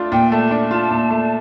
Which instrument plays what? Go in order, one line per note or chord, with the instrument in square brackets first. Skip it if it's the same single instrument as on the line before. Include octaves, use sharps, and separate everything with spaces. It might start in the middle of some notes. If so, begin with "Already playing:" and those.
Already playing: [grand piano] A3 D4 F4
[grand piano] A#2 [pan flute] G5
[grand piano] A3 [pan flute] A5
[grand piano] D4
F4
A#2
A3